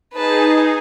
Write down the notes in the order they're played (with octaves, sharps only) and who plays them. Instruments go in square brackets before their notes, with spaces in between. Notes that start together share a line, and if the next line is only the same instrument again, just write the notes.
[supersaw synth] D#4 G#4 [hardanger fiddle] B4 A5